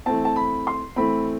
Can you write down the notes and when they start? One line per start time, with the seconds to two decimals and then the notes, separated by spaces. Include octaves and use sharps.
0.06 E3 A3 C4 A5
0.25 A5
0.36 B5
0.67 C6
0.96 E3 A3 C4 B5